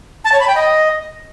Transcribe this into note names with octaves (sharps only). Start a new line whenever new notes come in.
A5
C#5
B5
G5
D#5